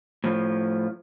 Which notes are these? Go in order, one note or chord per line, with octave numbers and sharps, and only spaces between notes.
A2 F3